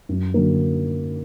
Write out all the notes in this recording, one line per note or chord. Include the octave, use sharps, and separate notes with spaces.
F#2
D3 F#3 A#3